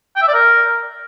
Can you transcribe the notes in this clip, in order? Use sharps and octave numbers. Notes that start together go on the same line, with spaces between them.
G5
E5
D5
A#4